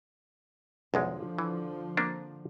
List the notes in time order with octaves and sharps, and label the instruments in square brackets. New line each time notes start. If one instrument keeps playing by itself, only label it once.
[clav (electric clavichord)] B1 E2 G#3 [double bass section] D3 F3
[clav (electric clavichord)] E3
A#3 C4 D4